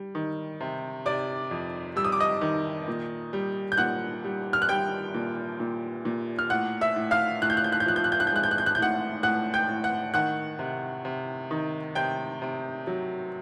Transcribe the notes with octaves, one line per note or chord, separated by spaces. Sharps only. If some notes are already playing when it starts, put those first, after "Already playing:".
Already playing: G3
D#3
C3
C3 D5 D6
F2
G3 E6
D#6
D6
D#5 D#6
D#3
A#2
G3
G6
A#2 F#5 F#6
G3
F6
F#6
G3 G5 G6
A#2
A#2
A#2
F6
A2 F#5 F#6
E5 E6
A2
F5 F6
A2 F#6
G6
F#6
G6
F#6
G6
F3 F#6
G6
F#6
G6
F#6
G6
G#3 F#6
G6
F#6
G6
F#6
G6
A2 F#5 F#6
A2 F#5 F#6
G5 G6
A2
F#5 F#6
D#3 F#5 F#6
C3
C3
D#3
C3 G5 G6
C3
F#3